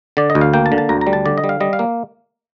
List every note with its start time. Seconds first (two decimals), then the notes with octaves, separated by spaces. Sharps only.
0.17 D3 D5
0.30 D#5
0.35 D2
0.41 F5
0.53 A#3 G5
0.66 A5
0.72 D3
0.78 A5
0.89 D2 A#5
1.01 A#5
1.07 G3
1.13 A5
1.26 D3 D5
1.38 D#5
1.44 G3
1.49 F5
1.60 G3 D#5
1.73 F5
1.79 A#3